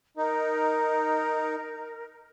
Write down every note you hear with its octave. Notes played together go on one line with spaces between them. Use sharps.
D#4 A#4